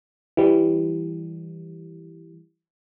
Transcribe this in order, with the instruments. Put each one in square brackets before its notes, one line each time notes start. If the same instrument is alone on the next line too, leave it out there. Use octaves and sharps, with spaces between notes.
[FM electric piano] E3 G3